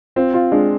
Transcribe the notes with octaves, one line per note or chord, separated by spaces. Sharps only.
C4 F4
F4
G#3 D4